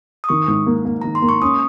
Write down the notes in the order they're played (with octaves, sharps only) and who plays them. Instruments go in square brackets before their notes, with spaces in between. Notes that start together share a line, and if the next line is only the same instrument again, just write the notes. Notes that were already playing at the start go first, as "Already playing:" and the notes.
[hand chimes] D#6
[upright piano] D#3 [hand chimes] C#6
[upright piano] G#2
A#3
A#3
[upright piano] D#3 [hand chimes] A#5
[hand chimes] C6
[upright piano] A#3
[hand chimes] C#6
[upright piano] C#4 [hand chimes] D#6